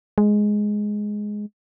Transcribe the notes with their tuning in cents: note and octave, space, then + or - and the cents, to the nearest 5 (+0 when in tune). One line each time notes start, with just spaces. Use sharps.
G#3 +5